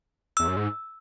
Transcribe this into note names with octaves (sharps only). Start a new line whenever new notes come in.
E2 E6
F#2
G#2